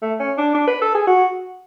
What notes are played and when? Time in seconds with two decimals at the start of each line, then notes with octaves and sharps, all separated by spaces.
0.02 A3
0.20 C#4
0.38 D4
0.54 D4
0.67 B4
0.81 A4
0.94 G#4
1.07 F#4